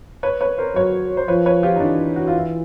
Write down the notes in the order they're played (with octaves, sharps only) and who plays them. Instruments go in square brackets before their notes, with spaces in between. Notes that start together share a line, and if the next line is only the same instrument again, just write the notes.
[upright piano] B4 C#5
B4 C#5
A#4 C5
[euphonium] F#3 [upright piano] B4 C#5
[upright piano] C5
[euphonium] F3 [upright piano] B4 C#5
[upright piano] B4 C#5
F4 G4
D#4
[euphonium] E3 [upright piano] D4
[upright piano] F#4
F4
E4